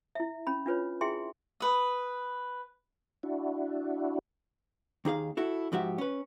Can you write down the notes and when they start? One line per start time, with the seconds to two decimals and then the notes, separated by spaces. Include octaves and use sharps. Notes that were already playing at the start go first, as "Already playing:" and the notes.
0.15 E4 E5
0.47 C#4 B5
0.66 D4 F4 B4 C#5
1.01 E4 G#4 E5 G5 G#5 C6
1.60 B4 D#6
3.23 D4 E4 F#4
5.05 D#2 D#4 G#4 F5
5.37 E4 F#4 A4
5.72 G#2 F3 F#4 G4 E5
5.98 C#4 B4